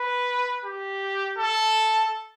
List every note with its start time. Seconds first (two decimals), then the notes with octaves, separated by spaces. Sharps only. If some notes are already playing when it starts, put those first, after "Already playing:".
Already playing: B4
0.64 G4
1.38 A4